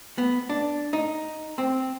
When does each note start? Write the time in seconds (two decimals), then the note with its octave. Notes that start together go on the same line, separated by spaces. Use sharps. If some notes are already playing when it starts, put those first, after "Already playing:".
0.18 B3
0.49 D4
0.93 D#4
1.58 C4